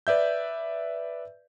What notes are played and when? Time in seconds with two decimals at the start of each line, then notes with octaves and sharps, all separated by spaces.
0.07 B4 D5 E5 G6